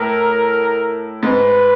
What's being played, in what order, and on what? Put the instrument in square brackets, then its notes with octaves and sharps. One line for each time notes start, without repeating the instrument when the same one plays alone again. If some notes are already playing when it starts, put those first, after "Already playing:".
Already playing: [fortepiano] A2 [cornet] A#4
[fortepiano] G#2 [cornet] B4